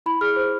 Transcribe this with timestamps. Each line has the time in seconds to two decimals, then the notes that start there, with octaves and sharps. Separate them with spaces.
0.06 E4 B5
0.21 G#4 F6
0.36 C5